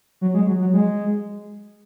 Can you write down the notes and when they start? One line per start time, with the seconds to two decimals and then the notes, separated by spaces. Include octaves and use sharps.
0.21 F#3
0.34 G#3
0.47 F#3
0.60 F#3
0.73 G#3